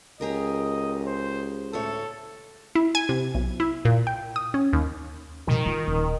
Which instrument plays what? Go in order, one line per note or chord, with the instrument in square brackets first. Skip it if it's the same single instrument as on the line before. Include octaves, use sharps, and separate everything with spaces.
[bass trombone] C#2 [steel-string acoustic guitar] G4 G#4 A#4 [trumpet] D#5
[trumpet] C5
[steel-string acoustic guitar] D2 A2 C#5 [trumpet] A4
[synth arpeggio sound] E4
G#5
C3
B1
E4
A#2
G5
D#6
C#4
D#2
[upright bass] B2 F3 [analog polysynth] D#3
[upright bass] E3 F4
D#1 G3